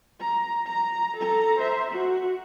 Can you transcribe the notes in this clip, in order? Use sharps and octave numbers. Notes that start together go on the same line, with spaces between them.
A#5
A#5
A4 A#5
C5 E5
F#4